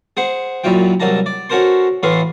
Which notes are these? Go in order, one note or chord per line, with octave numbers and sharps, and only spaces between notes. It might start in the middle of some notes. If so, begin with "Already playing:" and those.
G#4 C5 F#5
F#2 A#2 F#3 E4 F4 G5
C2 F#3 A#3 A5 A#5
D5
C#4 F#4 A4 A#4 C5 C6
A2 E3 A3 B3 F5 C6